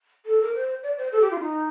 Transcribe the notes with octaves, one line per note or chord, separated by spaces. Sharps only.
A4
A#4
C5
D5
C5
A4
G4
F4
D#4